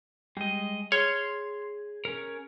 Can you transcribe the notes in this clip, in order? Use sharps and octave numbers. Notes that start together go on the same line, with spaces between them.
G3 G#3 D#5
G#4 C#5 C6 F6
C#4 A#4